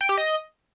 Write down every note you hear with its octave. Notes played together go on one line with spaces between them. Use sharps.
G5
G4
D#5